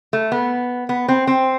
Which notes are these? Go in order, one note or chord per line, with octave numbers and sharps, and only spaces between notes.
A3
B3
B3
C4
C4